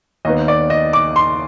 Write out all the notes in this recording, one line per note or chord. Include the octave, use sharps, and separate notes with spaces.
D#2 D#3 B3 D#5
D5
D#5
D6
C6